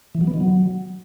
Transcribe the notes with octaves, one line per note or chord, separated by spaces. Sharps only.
E3
F#3
B3
D#3
F#3